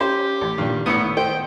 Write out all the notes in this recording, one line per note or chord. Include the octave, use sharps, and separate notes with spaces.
C#4 G4 C5
A1
G2 A#2 D#3
G#1 A2 B3 E4 D#6 C#7
C5 G5